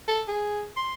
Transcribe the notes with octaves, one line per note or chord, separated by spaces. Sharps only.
A4
G#4
C6